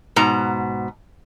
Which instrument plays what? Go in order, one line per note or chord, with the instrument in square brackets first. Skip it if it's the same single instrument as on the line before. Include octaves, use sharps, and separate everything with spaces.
[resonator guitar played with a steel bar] G#2 B2 A#5